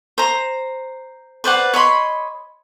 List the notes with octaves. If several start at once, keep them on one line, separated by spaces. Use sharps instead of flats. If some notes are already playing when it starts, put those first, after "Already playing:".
C5 A#5
B4 C5 D5 F#5
C#5 D#5 B5 C6